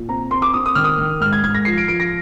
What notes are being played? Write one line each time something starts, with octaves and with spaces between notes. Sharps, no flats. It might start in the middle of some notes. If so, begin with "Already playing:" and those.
Already playing: A#2
C4 A#5
C4 C6
D6
C4 D#6
D#6
D#3 F6
D#6
D#3
G#2 F6
G#6
G#2 G#6
A#6
F3 C7
D7
F3 D7
A#6